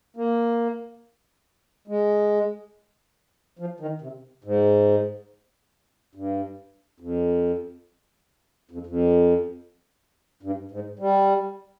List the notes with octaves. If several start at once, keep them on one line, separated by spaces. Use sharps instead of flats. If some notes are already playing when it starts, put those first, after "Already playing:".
A#3
G#3
F3
D#3
C3
G#2
G2
F2
F2
F2
G2
G#2
G3